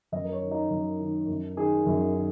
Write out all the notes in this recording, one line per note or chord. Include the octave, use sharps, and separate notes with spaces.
F#2 D#5
A#4
C#5
D#3
D#4
F#2
D#3
F#2
D#3 G#4
F#2
D#3